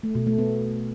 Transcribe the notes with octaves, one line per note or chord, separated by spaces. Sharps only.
A3
B2
A3
B3